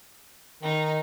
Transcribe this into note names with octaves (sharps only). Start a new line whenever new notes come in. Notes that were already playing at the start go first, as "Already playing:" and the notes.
D#3 D#4